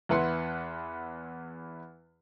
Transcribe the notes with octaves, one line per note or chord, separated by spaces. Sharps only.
E2 E4 B4 F#5 B5 C6